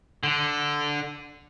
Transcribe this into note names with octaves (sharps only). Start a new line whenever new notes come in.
D3